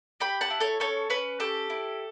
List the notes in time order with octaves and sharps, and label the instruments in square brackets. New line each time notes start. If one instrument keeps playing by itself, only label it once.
[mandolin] G4 G5 B5
F#5 A5
E4
A4 C#5
C#4 A4 C#5
C#4 B4
G4 A4
E4